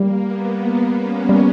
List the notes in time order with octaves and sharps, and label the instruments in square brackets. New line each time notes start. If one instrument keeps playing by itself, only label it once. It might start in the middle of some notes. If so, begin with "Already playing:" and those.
Already playing: [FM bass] G3 [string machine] A#3
[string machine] B3
C#4
[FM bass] G3